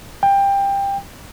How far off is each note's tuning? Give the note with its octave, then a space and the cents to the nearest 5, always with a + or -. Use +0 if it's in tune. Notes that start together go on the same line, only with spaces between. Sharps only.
G5 +20